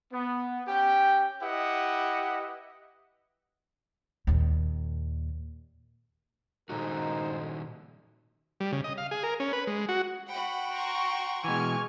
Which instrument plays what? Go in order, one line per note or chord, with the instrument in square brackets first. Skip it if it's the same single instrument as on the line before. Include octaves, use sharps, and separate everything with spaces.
[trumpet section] B3
C#4 G4 G5
E4 G4 B4 D#5 F#5
[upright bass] D#2 A#2
[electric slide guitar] A#2 D#3 F#4 [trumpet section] G#3 A4 C5 [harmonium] D#4
[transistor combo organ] G3
C#3
D#5
F5
G#4
A#4
C#4
B4
G#3
F#4
[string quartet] F#4 G5 [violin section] F#5 B5
[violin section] A#5 C6 C#6
[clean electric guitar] B2 E3 [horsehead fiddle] G#3 G#5 [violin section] C#6 F6